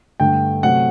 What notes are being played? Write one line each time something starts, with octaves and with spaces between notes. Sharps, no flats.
G2 D3 A3 G5
C3 F#3 A3 F#5